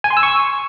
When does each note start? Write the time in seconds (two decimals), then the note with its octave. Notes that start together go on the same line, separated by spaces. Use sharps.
0.04 G#5
0.10 C6
0.17 E6
0.23 C#6